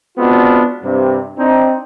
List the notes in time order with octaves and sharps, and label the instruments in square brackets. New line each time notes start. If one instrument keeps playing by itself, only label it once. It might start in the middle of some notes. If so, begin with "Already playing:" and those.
[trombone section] G#3 B3 C4 D4 F4 F#4
G2 C3
C4 D4 D#4